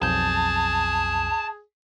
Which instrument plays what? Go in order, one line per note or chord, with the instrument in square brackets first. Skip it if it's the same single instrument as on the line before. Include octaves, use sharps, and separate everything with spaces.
[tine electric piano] B1 F2 G6 [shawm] G#4 [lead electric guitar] A5